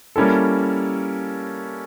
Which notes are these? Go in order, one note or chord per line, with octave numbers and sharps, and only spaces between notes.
G3 A#3 C#4 E4 A4